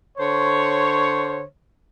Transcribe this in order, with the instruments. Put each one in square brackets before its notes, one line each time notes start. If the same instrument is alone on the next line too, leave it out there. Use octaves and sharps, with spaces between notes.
[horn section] D3 C5 C#5